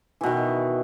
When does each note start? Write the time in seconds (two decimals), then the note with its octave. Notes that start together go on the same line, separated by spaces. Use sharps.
0.21 E3
0.23 B2
0.26 D#3